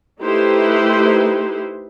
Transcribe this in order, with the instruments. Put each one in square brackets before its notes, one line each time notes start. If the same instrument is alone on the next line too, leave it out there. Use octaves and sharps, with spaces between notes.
[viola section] A3 D#4 E4 G4 B4 C5